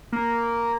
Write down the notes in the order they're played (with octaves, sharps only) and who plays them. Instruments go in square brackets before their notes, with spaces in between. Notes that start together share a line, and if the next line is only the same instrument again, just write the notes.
[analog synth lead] A#3